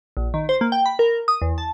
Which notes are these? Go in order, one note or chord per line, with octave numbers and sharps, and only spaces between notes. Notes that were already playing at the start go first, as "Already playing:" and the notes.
A#1
D#3
C5
A#3
G5
B5
A#4
D#6
E2
A5